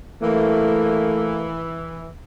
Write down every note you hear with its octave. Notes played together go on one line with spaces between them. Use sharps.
E3 A3 A#3